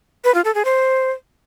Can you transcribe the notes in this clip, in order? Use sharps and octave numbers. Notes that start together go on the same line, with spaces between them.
B4
F4
A4
G#4
C5